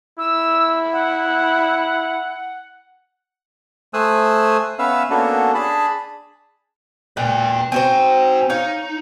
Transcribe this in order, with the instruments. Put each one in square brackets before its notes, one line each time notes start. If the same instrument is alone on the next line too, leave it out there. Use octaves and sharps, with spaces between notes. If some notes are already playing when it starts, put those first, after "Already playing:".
[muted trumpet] E4 [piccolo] E6
[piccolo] F#5
[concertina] A3 C5 G#5 D#6 E6 F#6
B3 C#4 B4 E5 F5 E6
A#3 B3 C#4 D4 F#4 A4
D4 G#4 A5 B5
[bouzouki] A#2 [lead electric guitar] B4 G5
[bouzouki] C4 F#4 C5 [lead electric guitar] D#4 G#5
[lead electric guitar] D#4 [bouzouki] C#5 F5